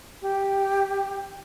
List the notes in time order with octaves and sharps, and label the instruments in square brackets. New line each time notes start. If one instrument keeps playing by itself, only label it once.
[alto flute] G4